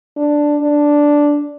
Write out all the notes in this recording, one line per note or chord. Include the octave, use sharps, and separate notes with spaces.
D4
D4